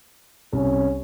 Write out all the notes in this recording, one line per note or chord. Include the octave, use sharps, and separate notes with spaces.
C2 C#4